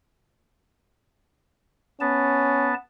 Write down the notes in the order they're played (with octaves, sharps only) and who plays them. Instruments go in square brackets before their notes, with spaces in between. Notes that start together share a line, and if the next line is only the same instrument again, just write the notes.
[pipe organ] B3 A5 [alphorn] C#4